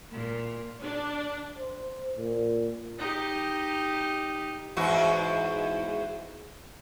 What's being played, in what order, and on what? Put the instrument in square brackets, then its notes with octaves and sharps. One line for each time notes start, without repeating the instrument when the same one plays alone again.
[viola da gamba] A#2
[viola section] D4
[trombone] C5
A#2
[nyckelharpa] D#4 G4
[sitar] E2 G#2 F#4